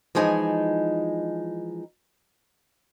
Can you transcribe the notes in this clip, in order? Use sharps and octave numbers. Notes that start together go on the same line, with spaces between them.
E3 F3 G#3 D#4 G#5